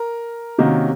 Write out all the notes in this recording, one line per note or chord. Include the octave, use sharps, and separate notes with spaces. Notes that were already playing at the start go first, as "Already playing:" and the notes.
Already playing: A#4
C3 D#3 A#3 C#4 F#4